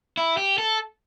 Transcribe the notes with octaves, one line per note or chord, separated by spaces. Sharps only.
E4
G4
A4